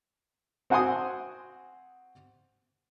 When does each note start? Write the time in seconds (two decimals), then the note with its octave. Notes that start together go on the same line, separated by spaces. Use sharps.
0.70 C4 F#4 F#5 G#5 C6 D#6